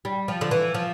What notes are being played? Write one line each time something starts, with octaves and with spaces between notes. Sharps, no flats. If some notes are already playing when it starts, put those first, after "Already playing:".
G3
F3
D3
E3
F3